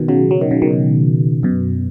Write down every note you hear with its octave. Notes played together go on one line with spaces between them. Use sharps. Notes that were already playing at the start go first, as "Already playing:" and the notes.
Already playing: B2 D#3
C#3 F#3
F#3
D#3
C#3
B2 D#3
F#2 B2